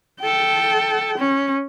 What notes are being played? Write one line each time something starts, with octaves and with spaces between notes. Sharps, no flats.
A4 G5
C#4